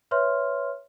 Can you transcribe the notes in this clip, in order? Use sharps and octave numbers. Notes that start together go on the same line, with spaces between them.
B4 C#5 E5 C6 F6